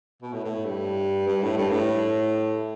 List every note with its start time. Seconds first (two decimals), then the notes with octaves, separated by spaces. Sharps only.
0.22 B2
0.33 A2
0.44 A2
0.65 G2
1.28 G2
1.43 A2
1.57 G2
1.70 A2